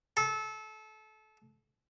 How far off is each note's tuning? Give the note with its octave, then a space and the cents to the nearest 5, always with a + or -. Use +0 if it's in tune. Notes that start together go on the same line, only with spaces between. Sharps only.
A4 -25